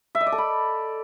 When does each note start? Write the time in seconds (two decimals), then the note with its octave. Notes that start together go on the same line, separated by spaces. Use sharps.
0.15 E5
0.21 D#5
0.26 D5
0.32 A4
0.38 B5